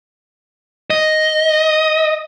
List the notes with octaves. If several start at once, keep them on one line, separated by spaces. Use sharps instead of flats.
D#5